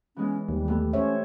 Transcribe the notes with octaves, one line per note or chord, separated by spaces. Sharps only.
E3 G#3 B3 C#4
D#2 G3
A3 B3 G4
C#4 C5 C#5 E5